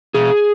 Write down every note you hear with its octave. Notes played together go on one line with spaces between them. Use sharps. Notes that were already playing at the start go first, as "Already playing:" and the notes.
B2 G#4